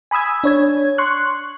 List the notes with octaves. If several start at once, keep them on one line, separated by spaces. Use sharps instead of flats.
G#5 B5 D#6 E6 G#6
D4 C#5 G#6
C6 C#6 F#6